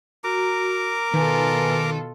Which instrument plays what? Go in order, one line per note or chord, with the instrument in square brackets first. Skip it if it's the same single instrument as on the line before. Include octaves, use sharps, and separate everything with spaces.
[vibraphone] F#4 [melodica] A#4 A#5 D6
[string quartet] B2 F4 A4 [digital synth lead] D#3 [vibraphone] B4 G#5